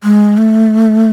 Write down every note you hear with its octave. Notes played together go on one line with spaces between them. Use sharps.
G#3
A3